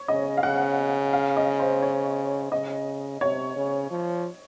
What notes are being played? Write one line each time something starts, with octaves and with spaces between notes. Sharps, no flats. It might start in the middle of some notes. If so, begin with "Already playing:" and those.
Already playing: C#5
C#3 D#5
F5
C#3 F#5
F5
D#5
C5
C#5
C#3 D#5
C3 C#5
C#3
F3